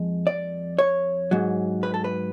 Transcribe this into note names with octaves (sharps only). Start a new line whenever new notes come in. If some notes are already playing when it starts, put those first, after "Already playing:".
Already playing: F2 G#3
D5
C#5
G#2 F#3
B4
A4
B4